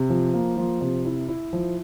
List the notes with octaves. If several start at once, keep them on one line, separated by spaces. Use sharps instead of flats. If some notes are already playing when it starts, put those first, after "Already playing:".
Already playing: C3
F3
A#3
F3
C3
E4
E4
F3